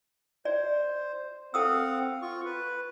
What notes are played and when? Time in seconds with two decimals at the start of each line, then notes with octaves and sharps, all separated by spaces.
0.45 C5 D5
1.54 C4 A4 F5 F#5 D#6 E6
2.22 F4 C#6
2.45 B4